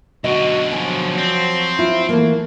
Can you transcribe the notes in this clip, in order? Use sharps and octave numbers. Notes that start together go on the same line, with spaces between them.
B1 D3 F#4 D#5
F3 F#3 G#5
C4
E4 F4
E3 A3 A#3